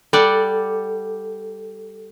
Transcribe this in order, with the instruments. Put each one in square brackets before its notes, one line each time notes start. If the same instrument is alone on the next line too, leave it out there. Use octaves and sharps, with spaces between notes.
[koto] G3 D5 F#5 [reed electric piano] A4